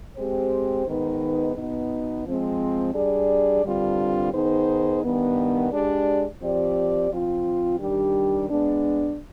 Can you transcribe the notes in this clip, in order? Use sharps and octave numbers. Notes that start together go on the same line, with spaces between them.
G#3 C4 G4 C5
G#2 D#3 B3 D#4 B4
B2 B3 D#4
F3 G#3 C4
G3 D4 G#4 D5
G2 D3 G3 C4 F4
D#3 B3 D#4 G#4 C5
G2 D#3 B3
G#3 D4 G4 D5
F3 C4 G4 D5
F3 C4 F4
D#3 G3 D4 G4
G#3 B3 D4